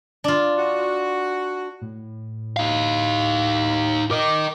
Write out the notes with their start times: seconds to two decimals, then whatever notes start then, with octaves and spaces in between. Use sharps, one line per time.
0.24 D4 F4
0.58 F#4
1.81 A2
2.56 D#4 F5
4.11 A#4 D#5 D6